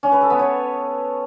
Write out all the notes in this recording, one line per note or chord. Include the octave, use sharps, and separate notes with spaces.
C#4
B4
A4
B3
C#5